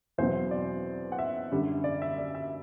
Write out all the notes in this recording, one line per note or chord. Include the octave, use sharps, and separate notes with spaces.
E2 B2 F#3 C4 C5
D5
F#5
E5
F#2 D3 G3
D5
E5
D5
E5